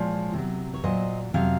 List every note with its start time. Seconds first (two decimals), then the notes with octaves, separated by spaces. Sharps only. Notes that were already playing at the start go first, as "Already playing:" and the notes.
Already playing: A#2 F3 G#3 C#5
0.34 C3 F#3
0.74 C#5
0.84 A#2 F#3 C5 D#5
1.33 F2 C3 F#3 F5